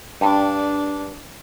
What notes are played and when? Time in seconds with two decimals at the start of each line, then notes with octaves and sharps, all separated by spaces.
0.21 G2 D4